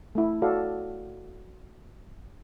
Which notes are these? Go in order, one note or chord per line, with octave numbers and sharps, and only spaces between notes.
A3 E4
F#4 A4 D5 F5